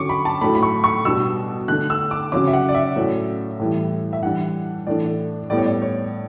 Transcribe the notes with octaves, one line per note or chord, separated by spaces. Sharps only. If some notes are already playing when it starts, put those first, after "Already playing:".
Already playing: D3 F#3 C#4 C#6 D6
B5
A5
A2 F#3 A3 D4 B5
B5
C#6
C#6
B2 G3 B3 D4 E6
D3 A3 D4 F#6
E6
D6
C#3 F#3 C#4 D6
E5
F#5
D5
E5
A2 F#3 C#4
A2 E3 G3
E5
E3 G3 D4 F#5
A2 E3 A3 D4 D5
A2 G3 B3 D5
C#5
D5
C#5